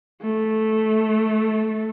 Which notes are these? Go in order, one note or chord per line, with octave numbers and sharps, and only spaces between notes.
A3